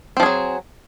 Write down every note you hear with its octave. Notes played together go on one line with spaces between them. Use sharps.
F3 F#3 C4 G#4